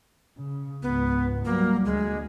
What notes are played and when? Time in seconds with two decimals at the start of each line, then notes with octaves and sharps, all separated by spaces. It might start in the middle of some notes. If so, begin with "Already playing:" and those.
0.37 C#3
0.83 C#2 G#2 B3
1.45 F#3 G3 A#3
1.85 D2 G#3